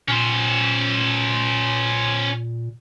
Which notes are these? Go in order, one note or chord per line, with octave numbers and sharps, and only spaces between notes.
A#2 C#4 C5